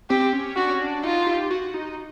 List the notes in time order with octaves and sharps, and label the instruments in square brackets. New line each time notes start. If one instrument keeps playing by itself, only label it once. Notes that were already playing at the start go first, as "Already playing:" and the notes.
[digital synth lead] C4 [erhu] G4
[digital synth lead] C#4
[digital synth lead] D4 [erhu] F#4
[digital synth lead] C#4
D4
[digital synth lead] D#4 [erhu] F4
[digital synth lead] G4
F#4
D#4